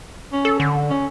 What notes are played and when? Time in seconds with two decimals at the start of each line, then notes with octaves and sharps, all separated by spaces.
0.32 C#4
0.45 A4
0.60 D3
0.90 C#4